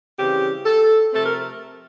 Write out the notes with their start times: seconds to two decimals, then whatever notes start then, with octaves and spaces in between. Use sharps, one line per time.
0.17 C#3 E3 G3 C4 G4
0.65 A4
1.13 C3 F3 A3 C4 A4
1.26 A#4